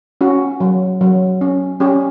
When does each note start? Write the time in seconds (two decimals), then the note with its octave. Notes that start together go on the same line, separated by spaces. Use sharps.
0.21 C#4 F#4
0.60 F#3
1.01 F#3
1.41 C#4
1.80 C#4 G4